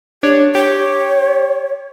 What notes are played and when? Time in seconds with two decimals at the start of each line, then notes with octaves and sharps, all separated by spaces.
0.23 D4 G4 C#5
0.55 G4 C#5